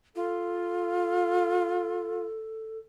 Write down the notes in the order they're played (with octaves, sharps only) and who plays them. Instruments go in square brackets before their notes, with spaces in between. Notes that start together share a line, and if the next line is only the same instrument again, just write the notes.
[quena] F4 [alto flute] A4